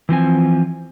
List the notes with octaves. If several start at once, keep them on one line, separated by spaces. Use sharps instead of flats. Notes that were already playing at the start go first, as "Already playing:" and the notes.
E3 F3 C4 G#5